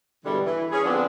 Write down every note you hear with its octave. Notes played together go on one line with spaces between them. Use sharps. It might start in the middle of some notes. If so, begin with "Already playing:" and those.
G2 B2 D3 E3 G3 G#3
E3
C#4 G#4
D3 F3 B3 C4 D4